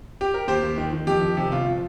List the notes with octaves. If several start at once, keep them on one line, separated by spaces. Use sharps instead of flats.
G4
A#4
D#2 G4 C5
D#2
D#3
D#3
F2 G4
D#3
C3
G1 F4
F3